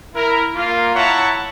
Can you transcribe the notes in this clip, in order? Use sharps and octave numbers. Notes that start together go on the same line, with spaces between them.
E4 A#4
A#3 F4
E4 C#5 E5 F#5 A5 A#5